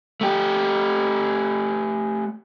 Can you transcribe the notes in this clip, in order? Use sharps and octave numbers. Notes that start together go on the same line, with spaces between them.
A3 G4